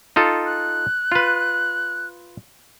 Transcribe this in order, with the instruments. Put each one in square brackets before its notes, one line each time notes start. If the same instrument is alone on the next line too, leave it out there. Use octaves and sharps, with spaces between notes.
[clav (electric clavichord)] D#4 F4 A4
[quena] F#6
[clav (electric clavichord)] F4 B4